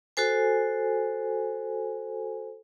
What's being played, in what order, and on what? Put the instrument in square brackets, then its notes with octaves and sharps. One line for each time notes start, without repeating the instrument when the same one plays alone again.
[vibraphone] F#4 A4 C5 G#5